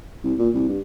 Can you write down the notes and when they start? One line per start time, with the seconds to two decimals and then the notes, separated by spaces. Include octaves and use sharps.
0.24 C2
0.39 A#2
0.54 C2
0.68 G2